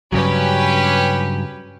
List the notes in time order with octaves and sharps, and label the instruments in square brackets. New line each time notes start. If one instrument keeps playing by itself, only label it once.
[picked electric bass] G2 C#3 F#3 [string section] C#4 G4 B4